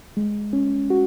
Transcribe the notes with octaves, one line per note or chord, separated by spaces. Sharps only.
G#3
C#4
F#4